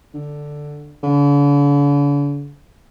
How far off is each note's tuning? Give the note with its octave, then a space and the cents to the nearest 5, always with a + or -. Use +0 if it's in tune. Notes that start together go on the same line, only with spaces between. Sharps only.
D3 +5
D3 -45